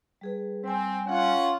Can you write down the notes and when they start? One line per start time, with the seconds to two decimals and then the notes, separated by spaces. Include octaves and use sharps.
0.21 G3 G#4 B4
0.64 G3 C4 G#5
1.07 C#4 F4 F#5